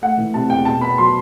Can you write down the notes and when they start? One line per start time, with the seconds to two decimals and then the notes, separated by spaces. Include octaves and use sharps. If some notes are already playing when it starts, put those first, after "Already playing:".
0.02 A3 F#5
0.18 E3
0.34 C3 A5
0.50 E2 G5
0.65 B2 A5
0.81 B3 B5
0.98 F#3 C6